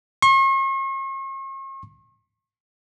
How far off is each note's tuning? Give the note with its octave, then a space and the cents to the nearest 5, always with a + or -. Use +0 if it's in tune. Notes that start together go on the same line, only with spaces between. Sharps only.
C#6 -45